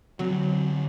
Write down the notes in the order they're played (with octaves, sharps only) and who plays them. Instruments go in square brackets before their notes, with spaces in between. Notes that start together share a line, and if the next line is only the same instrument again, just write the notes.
[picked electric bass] D3 C4 [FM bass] F#3